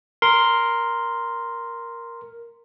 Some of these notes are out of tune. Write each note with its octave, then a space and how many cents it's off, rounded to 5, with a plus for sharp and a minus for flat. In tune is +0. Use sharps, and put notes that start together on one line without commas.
A#4 +0 C6 +0